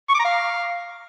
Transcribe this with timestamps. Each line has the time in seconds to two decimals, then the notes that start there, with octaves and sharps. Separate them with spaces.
0.09 C#6
0.14 D6
0.20 A#5
0.25 F5